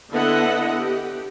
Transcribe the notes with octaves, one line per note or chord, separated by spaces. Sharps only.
D3 B3 E4 A4 D#5 F#5
G4